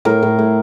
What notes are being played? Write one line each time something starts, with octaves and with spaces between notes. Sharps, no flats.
A2 A#4
A2
A2